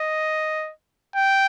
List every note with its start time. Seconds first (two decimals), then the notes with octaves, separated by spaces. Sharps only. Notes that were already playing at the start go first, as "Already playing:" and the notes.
Already playing: D#5
1.15 G5